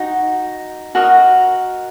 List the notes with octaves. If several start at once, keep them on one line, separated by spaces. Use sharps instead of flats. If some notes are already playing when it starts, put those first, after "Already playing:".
Already playing: D#4 F#4
F#4 A#4 D#5